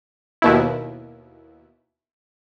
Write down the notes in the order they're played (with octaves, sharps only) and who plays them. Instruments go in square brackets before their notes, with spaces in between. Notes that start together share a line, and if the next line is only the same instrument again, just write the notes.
[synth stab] D#2 B2 E4